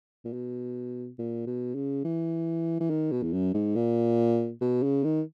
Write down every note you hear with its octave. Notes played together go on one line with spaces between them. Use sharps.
A#2
B2
A#2
B2
C#3
E3
E3
D#3
B2
E2
F#2
G#2
A#2
B2
C#3
D#3